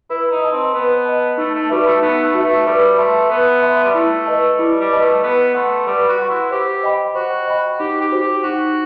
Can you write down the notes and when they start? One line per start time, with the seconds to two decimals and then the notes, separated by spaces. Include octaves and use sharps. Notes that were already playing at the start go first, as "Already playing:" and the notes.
0.10 E4 B4
0.31 D#4
0.42 D#5 A5
0.53 C4
0.74 B3 B4
1.05 D#5 A5
1.38 A3 D#4
1.54 A3
1.70 G3 F#4 B4 E5
1.86 A3
2.02 B3 D#4
2.23 A3
2.34 F#4 B4 E5
2.46 A3
2.66 G3 B4
2.98 A3 E5 A5 C6
3.30 B3 B4
3.62 E5 A5 C6
3.84 G3
3.94 A3 E4
4.26 B4 D#5 A5
4.59 G3 E4
4.80 G3
4.90 B4 D#5 A5
5.02 A3
5.23 B3 B4
5.55 A3 F#5 C6
5.87 G3 B4
6.08 F#4
6.19 F#5 C6
6.30 E4
6.51 G4 C5
6.83 D#5 G5 B5
7.15 F#4 C5
7.47 D#5 G5 B5
7.79 D#4 G4
8.01 G4
8.12 F#4 C5
8.22 G4
8.43 D#4 F#4